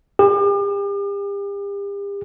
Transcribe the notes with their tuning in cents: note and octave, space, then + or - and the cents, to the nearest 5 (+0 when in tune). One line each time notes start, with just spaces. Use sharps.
G4 +40